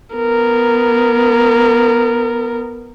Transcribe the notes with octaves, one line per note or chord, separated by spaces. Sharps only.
B3 A#4